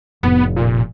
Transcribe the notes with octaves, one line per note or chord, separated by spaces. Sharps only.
F1 A2 B3
A#2